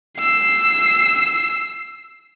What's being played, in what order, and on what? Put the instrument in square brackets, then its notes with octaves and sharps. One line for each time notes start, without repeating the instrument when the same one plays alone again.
[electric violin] E6 C7